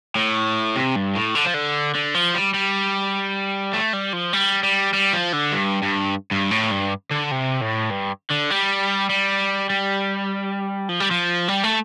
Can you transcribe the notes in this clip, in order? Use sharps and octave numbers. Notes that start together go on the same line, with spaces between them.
A2
C3
G2
A2
D3
F3
D3
D3
F3
G3
G3
A3
G3
F3
G3
G3
G3
F3
D3
G2
G2
G2
A2
G2
D3
C3
A2
G2
D3
G3
G3
G3
F3
G3
F3
G3
A3